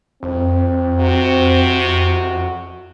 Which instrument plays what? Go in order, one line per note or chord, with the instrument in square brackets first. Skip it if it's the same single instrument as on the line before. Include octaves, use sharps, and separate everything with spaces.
[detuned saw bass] F2 [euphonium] C4
[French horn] C3 [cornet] F#4